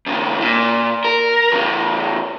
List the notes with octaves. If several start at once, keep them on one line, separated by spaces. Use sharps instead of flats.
D#2 C#3
A#2
A#4
E2 C#3